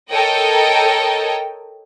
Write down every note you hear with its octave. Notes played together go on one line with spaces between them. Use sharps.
A4 A#4 C#5 D#5 G5